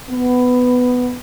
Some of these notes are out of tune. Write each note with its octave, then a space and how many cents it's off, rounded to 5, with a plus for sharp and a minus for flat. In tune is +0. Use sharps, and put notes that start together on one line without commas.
B3 +10